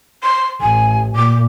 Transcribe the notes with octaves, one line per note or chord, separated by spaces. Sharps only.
C6
A1 G#5
A#2 D6